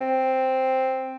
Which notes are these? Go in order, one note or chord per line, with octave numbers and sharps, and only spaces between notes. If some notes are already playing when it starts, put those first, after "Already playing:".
C4